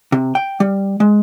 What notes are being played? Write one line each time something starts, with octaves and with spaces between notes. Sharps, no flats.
C3
G5
G3
G#3